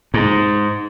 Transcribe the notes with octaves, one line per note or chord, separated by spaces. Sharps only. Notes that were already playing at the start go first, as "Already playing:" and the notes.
G#2